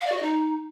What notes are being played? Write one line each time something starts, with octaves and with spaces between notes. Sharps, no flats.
F5
D5
F#4
D#5
D#4